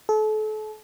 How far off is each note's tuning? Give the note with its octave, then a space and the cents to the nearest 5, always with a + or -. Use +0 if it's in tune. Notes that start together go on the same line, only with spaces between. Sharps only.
A4 -35